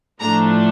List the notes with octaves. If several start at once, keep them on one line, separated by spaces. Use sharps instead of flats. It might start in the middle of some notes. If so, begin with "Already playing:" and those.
A2 F3 A3 D4 A#5